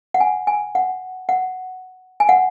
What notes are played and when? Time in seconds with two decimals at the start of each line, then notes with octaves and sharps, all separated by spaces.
0.14 F#5
0.20 G#5
0.47 G#5
0.75 F#5
1.29 F#5
2.20 G#5
2.29 F#5